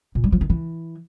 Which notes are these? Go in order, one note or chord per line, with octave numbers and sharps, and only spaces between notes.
A#2
G3
F3
D#3
E3